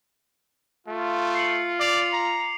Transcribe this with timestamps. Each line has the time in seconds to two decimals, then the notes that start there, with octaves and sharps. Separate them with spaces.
0.87 A3 F4
1.35 C7 C#7 F#7
1.80 D5 D6 C7 F7
2.13 A#5